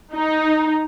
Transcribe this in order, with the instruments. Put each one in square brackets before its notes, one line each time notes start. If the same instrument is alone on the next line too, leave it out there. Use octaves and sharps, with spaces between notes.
[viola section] D#4